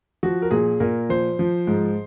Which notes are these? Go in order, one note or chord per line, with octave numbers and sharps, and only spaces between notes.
F3 F#4
A#4
A#2 G#4
A#2 A#4
F3 C5
F3
G#2